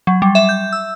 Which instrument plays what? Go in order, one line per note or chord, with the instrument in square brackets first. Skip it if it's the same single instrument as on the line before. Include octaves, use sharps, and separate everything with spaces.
[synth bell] F#3
G3
E5
G6
E6